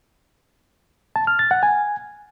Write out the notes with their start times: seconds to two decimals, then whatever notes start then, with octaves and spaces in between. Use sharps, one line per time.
1.16 A5
1.27 F6
1.39 A6
1.51 F#5
1.63 G#5